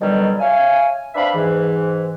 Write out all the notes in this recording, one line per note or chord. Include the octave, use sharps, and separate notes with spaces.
B2 D3 D#3 F#3 G3
C#5 E5 F5 G#5
C4 D4 B4 E5 F5 B5
G#2 E3